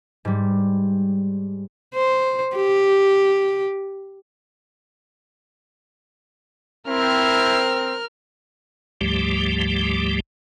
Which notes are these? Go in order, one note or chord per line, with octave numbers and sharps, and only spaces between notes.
G#2 G3
C5
G4
C4 E4 A#4 F6
D2 G#2 F3 G3 A3 G4